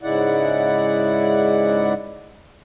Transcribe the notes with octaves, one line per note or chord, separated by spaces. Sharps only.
G#2 C#3 G#3 E4 D5 F#5